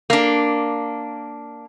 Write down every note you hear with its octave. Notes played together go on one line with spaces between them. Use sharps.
A#3 D4